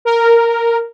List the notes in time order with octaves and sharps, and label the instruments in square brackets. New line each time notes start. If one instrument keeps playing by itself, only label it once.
[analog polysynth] A#4